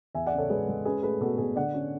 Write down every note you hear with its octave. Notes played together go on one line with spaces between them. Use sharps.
E2 E5 G#5
D5 F#5
C#3
A4 C#5
G#3 G#4 B4
G#3
C#4 G#4 B4
A3 G#4 B4
B2 F#4 A4
B2 G#4
D3 D5 F#5
C#4